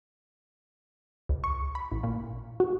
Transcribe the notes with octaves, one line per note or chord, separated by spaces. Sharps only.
C#2
C#6
B5
A1
A#2
F#4